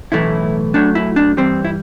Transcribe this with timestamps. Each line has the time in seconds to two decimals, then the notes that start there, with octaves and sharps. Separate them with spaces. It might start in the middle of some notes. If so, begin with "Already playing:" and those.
0.12 B1 A2 E3 A3 E4
0.74 F#2 F#3 A3 D4
0.95 E4
1.16 D4
1.37 G2 E3 G3 C4
1.65 E4